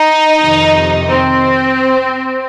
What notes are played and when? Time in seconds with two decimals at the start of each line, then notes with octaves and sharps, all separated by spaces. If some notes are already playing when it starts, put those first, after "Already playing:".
Already playing: D#4
0.41 F2 C3 D#3
1.08 C4